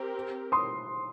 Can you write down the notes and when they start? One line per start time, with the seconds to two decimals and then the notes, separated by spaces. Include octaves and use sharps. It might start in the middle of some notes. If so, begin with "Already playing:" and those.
Already playing: C4 G4 A#4
0.52 C6 D#6